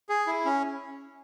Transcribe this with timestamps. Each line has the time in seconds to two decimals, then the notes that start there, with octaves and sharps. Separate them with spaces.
0.09 G#4
0.27 E4
0.45 C#4